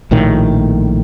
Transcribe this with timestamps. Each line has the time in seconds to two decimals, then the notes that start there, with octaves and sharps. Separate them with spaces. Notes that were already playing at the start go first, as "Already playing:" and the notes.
0.11 A#1 A2 D#3